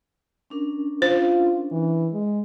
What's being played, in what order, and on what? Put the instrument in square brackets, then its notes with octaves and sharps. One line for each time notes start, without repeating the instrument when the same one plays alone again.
[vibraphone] C#4 D4 A#4
[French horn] F4 [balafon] C5
[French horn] E3
G#3